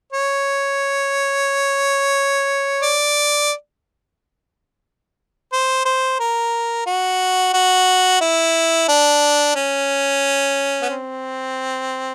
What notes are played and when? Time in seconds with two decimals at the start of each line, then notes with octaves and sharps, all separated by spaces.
0.12 C#5
2.82 D5
5.52 C5
5.85 C5
6.20 A#4
6.87 F#4
7.53 F#4
8.21 E4
8.89 D4
9.55 C#4
10.82 B3
10.90 C4